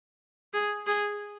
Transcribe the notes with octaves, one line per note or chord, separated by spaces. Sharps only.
G#4
G#4